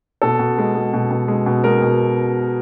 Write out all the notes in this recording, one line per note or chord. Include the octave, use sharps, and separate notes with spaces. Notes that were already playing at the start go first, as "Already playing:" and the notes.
B2 A4
B2
G#3
G#3
B2
B2
G#3
B2
G#3 A#4
B2